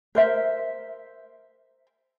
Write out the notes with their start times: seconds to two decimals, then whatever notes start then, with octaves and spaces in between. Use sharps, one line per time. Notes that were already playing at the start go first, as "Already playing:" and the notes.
0.15 A#4 C5 E5